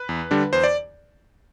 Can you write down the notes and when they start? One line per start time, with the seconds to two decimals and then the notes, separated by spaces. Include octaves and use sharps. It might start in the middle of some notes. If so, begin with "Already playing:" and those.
Already playing: B4
0.09 E2
0.31 D3 G3 D4
0.53 E2 C5
0.64 D5